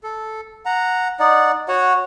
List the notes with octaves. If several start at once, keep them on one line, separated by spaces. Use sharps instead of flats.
A4
F#5 A#5
D#4 D5 F#5
F#4 C#5 F#5